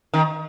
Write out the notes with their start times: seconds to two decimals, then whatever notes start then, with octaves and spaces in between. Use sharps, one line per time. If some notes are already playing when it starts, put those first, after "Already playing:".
0.14 D#3